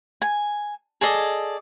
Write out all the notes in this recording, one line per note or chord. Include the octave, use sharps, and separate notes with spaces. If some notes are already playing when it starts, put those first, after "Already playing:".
G#5
G#4 A4 D5 D#5